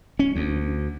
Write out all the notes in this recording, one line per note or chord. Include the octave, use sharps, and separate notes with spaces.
C#4
D2